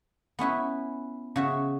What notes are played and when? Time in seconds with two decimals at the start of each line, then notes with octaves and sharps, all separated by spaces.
0.39 B3 C#4 E4 B4
1.36 C#3 F#4 E5